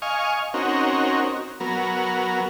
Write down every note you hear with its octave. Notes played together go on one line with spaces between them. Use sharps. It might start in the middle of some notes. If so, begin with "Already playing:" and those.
D#5 F5 G#5 C#6
C4 C#4 D#4 F#4 A#4
F#3 B3 A#4